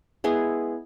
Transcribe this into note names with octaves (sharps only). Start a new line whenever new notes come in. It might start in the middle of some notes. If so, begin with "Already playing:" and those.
G#3 B3 E4 G#4